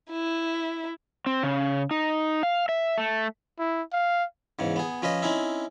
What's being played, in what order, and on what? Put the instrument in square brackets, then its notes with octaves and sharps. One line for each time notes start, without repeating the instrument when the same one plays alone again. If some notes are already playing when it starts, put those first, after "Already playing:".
[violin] E4
[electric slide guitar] C4
C#3
D#4
F5
E5
A3
[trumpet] E4
F5
[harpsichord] E2 G#2 C#3
B3 G#4
F3 C#4 B4 D#5
C4 C#4 D#4 E4